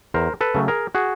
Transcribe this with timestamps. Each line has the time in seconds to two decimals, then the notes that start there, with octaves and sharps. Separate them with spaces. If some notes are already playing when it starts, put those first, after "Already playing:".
0.14 E2 A#4 C5
0.41 A4 B4
0.55 C#3 F#3 A3
0.68 G#4 A#4
0.95 F#4 G#4